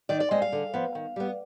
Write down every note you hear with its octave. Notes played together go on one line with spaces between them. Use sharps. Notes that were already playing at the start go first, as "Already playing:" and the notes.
D#3 D5
D5
G#3 C4 D#5
F5
D3
F3 B3
D#3
G3 B3